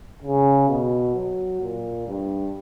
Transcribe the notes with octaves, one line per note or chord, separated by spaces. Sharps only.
C#3
B2
F#3
A#2
G2